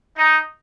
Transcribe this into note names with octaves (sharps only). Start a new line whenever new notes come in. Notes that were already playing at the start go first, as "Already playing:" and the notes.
D#4